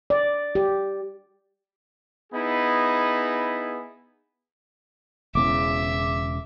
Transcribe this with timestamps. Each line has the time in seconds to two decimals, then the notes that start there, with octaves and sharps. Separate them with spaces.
0.10 D5
0.55 G4
2.33 B3 D#4 E4 G#4
5.35 E1 E2 C#3 E5 D6